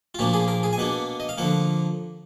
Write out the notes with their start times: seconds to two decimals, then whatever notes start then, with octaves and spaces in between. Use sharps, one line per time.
0.15 F4
0.19 A#2 F3 A#3 D4 F#4
0.33 G#4
0.48 A#4
0.63 G#4
0.73 G#5
0.78 B2 A#3 D4 F#5
1.20 D#5
1.29 F5
1.38 D3 F3 A#3 F#5